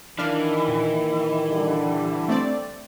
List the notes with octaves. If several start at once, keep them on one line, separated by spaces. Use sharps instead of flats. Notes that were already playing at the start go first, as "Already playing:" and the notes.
D#3 E3 D4 F5
A#2
D3 G3
A3 C4 D5